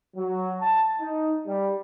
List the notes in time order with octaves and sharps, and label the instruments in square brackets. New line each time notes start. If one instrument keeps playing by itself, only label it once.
[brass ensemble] F#3
A5
D#4
G3